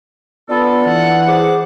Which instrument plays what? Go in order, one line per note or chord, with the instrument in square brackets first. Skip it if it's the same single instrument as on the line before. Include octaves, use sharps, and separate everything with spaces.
[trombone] B3 [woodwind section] D4 F4 A4
[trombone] E3 [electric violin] F#5
[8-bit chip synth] G#4 C5 D6